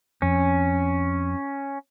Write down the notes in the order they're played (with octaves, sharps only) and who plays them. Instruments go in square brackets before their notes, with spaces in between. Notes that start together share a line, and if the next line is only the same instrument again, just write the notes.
[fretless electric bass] F2 [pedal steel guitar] C#4